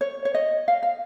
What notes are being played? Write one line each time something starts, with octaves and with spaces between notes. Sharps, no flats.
C#5
C#5
D#5
F5
F5